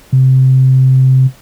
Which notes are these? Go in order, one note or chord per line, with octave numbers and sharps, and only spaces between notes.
C3